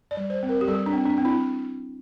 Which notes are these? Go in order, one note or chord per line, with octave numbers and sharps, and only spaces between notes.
D5
G3
C5
C4
A#4
G4
G3 A4
D4
C4
D4
C4
E4